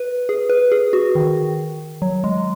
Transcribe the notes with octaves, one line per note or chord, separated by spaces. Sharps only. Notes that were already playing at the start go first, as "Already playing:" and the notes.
Already playing: B4
G#4
B4
G#4
F#4
D#3
F#3
G#3